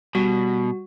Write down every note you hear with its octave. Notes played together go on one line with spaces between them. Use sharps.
B2 G3 F#4